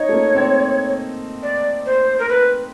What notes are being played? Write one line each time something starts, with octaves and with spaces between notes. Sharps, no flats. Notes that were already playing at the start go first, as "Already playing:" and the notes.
Already playing: D#4 C#5
A3
A#3
C4
D5
C5
A#4
B4